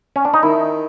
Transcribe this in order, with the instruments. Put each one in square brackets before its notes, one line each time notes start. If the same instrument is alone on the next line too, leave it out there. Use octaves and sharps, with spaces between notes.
[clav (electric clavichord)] C#4
D4
D#4
[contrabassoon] D#3 [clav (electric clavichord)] E4